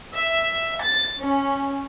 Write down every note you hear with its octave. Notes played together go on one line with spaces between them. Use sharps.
E5
A6
C#4